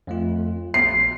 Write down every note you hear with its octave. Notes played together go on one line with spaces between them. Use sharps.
F2 A3 F4
A#1 C6 C7